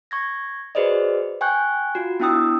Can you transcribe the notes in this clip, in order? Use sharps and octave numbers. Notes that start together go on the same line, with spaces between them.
C#6 G#6 A#6
F#4 G#4 B4 C5 D5 D#5
G5 G#5 C#6 F#6 G6
F4 F#4
B3 D4 E4 G5 D#6 E6